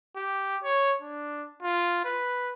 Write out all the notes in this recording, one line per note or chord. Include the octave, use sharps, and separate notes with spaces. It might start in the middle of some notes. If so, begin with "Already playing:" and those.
G4
C#5
D4
F4
B4